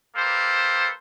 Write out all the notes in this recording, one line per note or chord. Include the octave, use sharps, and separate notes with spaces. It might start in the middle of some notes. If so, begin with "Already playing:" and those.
A#3 G4 A4 B4 C5